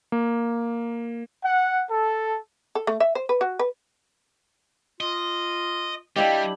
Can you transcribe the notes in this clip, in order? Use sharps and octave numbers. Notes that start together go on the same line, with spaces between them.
A#3
F#5
A4
A4
A3
E5
C5
B4
F#4
B4
F4 D#5
G3 D4 E4 G4 D#5 F5 G5